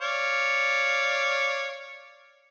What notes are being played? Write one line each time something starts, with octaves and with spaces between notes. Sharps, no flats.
C#5 D5 F5